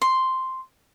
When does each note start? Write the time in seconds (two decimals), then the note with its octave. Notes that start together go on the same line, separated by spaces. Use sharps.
0.02 C6